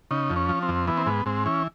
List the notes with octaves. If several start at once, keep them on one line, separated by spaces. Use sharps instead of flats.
C#3 D#4
F2
C#4
F3
C4
F2
E3 B3
C4
G#2 B3
G#2 C4
E3 C#4